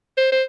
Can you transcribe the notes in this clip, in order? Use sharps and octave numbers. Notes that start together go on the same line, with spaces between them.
C5
C5